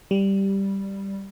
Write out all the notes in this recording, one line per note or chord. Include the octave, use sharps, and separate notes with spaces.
G3